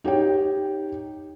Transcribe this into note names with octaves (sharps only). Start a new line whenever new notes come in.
D#4 G4 C#5 G5